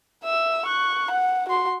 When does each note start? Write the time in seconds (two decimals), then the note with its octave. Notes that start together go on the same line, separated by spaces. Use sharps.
0.24 E5 E6
0.66 C#6 F#6
1.11 F#5
1.49 F#4 C6